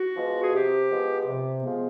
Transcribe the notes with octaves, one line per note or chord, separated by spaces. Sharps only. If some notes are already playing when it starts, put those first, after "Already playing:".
Already playing: F#4
F3 G#3 B3
G#4
C3 G4
F3 G#3 B3
C3
F3 G#3 B3